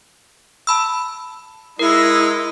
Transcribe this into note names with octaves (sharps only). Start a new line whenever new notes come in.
A5 B5 E6
G#3 D#4 E4 A#4